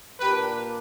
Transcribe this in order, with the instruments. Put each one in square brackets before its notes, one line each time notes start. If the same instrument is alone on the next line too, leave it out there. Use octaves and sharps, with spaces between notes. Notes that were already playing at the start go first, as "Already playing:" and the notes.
[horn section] A#2 A#3 D4 G4 B4